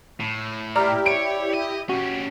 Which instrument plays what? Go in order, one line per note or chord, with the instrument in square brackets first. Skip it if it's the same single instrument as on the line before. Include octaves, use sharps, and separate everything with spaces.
[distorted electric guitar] A2
[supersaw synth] E4 G4 [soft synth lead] D5 [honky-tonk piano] A#5 F6
[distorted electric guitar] C#5 [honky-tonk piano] D7
[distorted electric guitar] D#5
[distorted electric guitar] C#4 G4 [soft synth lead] F#4